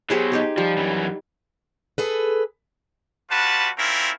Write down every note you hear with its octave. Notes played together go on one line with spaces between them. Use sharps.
B2 F#3 G4 G#4 C5
D#4 G4 G#4
F3 G3
F#2 E3
G#4 A4 B4
G3 F4 F#4 B4 A5
C4 C#4 E4 F4 A#4